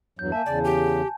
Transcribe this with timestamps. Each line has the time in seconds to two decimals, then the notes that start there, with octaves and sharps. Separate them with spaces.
0.19 E2 G2 F#3 G6
0.32 A#3 E5 G#5 A5
0.46 E2 C#3 D5
0.65 G4 G#5